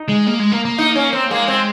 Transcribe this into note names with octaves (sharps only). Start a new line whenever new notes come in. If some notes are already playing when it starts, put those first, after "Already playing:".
Already playing: D#4
G#3
A#3
G#3
A#3
A#3
D#4
C#4
C4
G#3 A#3
C4